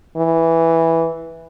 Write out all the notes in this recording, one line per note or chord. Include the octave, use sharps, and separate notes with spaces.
E3